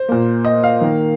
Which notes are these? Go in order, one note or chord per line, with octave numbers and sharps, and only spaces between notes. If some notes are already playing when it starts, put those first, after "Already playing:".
Already playing: C5
A#2 A#3
D#5
F5
D#3 A#3